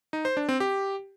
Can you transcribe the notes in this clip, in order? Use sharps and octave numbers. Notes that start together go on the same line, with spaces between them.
D#4
C5
D4
C4
G4